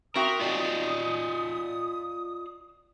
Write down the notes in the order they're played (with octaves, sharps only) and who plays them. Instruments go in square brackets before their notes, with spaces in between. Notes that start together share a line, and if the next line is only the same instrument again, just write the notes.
[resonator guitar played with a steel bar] C4 F#4 E5 [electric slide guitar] A#4 [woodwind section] D#6
[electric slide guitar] F4 D5 D#5